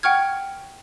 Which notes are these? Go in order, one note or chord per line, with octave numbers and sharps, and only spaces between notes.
F#5 G5 C#6 F6 G#6